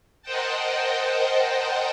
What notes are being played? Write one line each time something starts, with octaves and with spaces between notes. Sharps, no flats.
A#4 C5 D#5 F#5 G5 A5